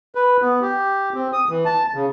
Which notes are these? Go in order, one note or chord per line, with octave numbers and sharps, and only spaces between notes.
B4
B3
G4
C4
D#6
E3
A5
C#3